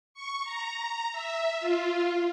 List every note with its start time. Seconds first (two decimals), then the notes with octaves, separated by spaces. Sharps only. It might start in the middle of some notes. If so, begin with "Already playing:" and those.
0.14 C#6
0.44 A#5
1.12 E5
1.59 F4